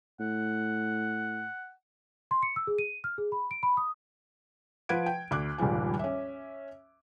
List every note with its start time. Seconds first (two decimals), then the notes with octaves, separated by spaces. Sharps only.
0.20 A2 F#5
2.31 C6
2.43 C#7
2.56 E6
2.67 G#4
2.78 D#7
3.04 F6
3.18 G#4
3.32 B5
3.51 D7
3.63 B5
3.77 D#6
4.89 F3 B4 F#5 G#6 D7
5.06 G5
5.31 D2 D6 F#6
5.58 D#1 C#2 G2 F3 G#5
5.99 C#4 E5